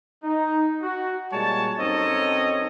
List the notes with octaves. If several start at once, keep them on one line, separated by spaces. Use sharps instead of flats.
D#4
F#4
A#2 G3 G#3 C#5 A5
F#2 C4 D#4 A4 C#5 D#5